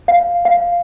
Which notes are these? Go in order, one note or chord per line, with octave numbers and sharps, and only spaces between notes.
F5
F5